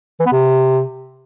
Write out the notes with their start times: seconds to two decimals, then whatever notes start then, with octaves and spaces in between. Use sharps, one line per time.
0.20 E3
0.26 B3
0.32 C3